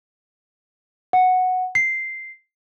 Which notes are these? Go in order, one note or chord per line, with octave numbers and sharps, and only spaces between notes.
F#5
C7